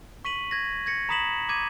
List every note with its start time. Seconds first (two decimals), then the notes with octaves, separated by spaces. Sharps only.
0.25 C#6 B6 D#7 F#7
0.51 G#6 A#6
0.86 G#6 A#6 C#7
1.09 A#5 B5 D#6 B6 E7 F#7
1.49 D6 G#6 D#7